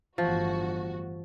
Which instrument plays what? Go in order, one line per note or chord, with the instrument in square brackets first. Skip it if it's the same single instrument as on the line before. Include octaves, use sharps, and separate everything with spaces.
[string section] G1 A2 F#4 [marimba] E3 [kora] F3